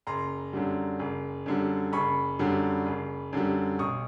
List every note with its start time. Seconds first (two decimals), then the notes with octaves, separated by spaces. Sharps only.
0.07 F#1 A#5 C6
0.53 F#2 D3 G3
0.99 F#1
1.46 F#2 D3 G3
1.93 F#1 B5 C#6
2.39 F#2 D3 G3
2.86 F#1
3.33 F#2 D3 G3
3.79 B1 C#6 D#6